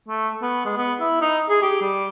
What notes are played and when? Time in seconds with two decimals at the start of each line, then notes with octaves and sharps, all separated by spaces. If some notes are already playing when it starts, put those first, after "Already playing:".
0.08 A3
0.42 B3
0.65 G#3
0.78 B3
1.00 E4
1.21 D#4
1.49 G#4
1.62 G4
1.81 G3